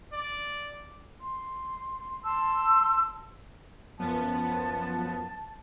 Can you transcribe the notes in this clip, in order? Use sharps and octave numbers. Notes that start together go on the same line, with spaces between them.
D5
C6
A5 C6 E6
F#2 F3 B3 A5